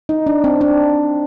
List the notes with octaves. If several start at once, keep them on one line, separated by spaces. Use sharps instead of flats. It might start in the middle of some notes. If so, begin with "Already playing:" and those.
D#4
D4
C4
D4